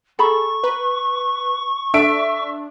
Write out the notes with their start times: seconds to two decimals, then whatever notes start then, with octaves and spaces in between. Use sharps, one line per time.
0.19 G#4 A4 A#5 B5 C#6
0.64 B4 A#5
1.94 D4 A4 E5 D7